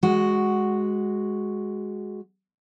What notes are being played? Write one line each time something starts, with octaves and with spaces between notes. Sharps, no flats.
G#3 F#4